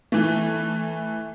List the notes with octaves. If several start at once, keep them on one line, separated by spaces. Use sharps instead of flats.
E3 A3